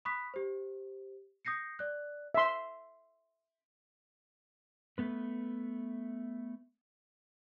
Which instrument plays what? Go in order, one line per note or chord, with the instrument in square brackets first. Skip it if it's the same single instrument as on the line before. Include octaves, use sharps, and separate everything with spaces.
[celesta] B5 C#6 D#6 F#6 B6
G4 C5
D#6 G6 A#6 C7 C#7
D5 F#6
[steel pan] E5 C6
[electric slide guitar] A3 B3 B4